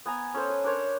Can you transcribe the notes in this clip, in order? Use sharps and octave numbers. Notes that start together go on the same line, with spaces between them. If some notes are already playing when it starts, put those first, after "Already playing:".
B3 G#5 A#5
C#4 A4 C5
B4
D4 A#4 C5 C#5